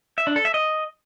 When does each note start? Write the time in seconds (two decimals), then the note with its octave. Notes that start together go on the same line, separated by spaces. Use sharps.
0.18 E5
0.27 D4
0.36 A4
0.45 E5
0.54 D#5